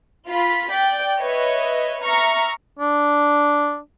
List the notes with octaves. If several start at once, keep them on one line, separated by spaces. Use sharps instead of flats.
F4 B5 B6
D5 G5
B4 C#5 D#5 E5
E5 A#5 C#6 F6
D4